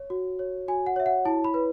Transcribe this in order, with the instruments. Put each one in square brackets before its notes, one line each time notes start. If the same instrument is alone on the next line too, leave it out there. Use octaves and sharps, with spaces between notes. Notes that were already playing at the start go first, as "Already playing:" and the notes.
Already playing: [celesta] C#5
F#4
C#5
F#4 G#5
F#5
C#5 E5
F#5
E4 A5
B5
B4